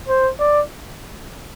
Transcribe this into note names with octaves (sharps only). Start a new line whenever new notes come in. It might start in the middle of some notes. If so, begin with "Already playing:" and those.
C5
D5